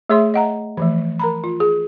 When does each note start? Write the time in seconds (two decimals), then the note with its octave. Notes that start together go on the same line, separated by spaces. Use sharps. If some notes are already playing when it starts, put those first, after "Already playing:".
0.10 A3 G#4 C#5 E5 C6
0.34 D#5 F#5 A#5
0.77 E3 F3 A3
1.19 A#4 A#5 B5
1.44 F4
1.60 G#4